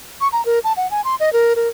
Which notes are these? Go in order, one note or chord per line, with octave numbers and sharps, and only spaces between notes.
C#6
A#5
A#4
A5
F#5
G#5
C6
D#5
A#4
A#4